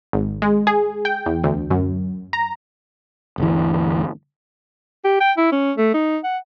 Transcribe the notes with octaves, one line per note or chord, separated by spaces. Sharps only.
G#1
G#3
G#4
G5
E2
D2
F#2
A#5
G1 D2 E3
G4
G5
E4
C#4
A3
D#4
F#5